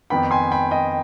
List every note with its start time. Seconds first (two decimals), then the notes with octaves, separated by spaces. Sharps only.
0.10 F2 D#3 B3 G5 B5
0.31 G#5 C6
0.51 G5 B5
0.71 D#5 G5